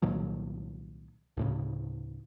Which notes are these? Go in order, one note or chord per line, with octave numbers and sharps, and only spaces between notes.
C2 A#2 D#3 F#3
D2 A2 C#3